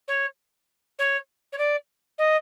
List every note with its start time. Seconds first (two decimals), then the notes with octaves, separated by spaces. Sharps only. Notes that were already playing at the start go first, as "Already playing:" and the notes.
0.08 C#5
0.99 C#5
1.52 C#5
1.58 D5
2.18 D#5